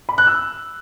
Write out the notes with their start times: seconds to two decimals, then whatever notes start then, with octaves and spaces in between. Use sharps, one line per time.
0.09 B5
0.18 F#6
0.27 E6